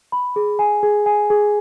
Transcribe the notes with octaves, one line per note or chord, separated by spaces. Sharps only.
B5
G#4
G#5
G#4
G#5
G#4